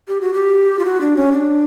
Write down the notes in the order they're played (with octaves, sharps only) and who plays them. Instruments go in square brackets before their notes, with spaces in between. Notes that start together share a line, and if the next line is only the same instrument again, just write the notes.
[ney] G4
F#4
G4
F4
F#4
D4
C#4
D4